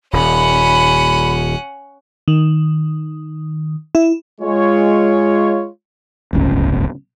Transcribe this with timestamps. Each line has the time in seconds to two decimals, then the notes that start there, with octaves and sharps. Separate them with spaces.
0.13 D#1 C#4 F#5 B5
2.28 D#3
3.95 E4
4.41 G#3 F4 C#5
6.33 D1 G1 C#2 C#4